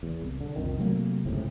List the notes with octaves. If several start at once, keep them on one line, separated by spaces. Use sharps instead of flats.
E2
C2
D3
C2 F2 D#3
C3 F#3 A3 A#3
G1 C#2 A2 C3